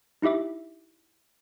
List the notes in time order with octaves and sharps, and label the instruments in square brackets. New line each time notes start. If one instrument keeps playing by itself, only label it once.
[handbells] D#4 E4 G4 E5 D6